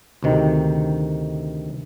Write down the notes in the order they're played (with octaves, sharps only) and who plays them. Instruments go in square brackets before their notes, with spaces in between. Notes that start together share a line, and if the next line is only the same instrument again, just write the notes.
[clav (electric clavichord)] D2 C3 D#3